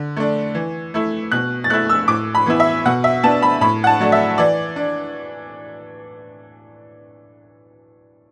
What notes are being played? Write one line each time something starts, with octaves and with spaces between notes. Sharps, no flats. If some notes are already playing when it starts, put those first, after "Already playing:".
Already playing: D3
A3 D4
E3
A3 E4
B2 F#6
A6
A3 E4 F#6
E6
A2 D6
B5
E3 B3 E4
E5
B2 F#5
E5
B3 D4 A5
B5
A2 B5
F#5
A5
F#3 A3 D4
E5
E3 D5
D4